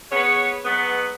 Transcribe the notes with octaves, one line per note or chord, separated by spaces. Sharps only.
B3 G#4 B4 C#5
F#3 G#3 B3